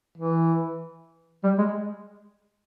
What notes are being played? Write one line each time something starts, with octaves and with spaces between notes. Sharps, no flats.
E3
G3
G#3